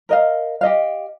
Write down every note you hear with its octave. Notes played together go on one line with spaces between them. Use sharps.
A#4 D#5 F5
G4 D#5 F5